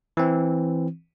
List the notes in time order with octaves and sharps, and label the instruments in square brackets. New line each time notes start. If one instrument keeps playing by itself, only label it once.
[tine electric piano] E3 C4